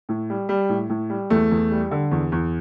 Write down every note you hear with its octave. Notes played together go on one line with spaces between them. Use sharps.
A2
G3
G3
A2
A2
G3
E2 A3
E2
G3
D3
E2
E2